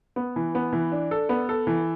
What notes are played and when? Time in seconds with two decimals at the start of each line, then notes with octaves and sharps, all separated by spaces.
0.16 B3
0.36 E3
0.55 B3
0.73 E3
0.92 D4
1.11 A4
1.29 B3
1.49 A4
1.67 E3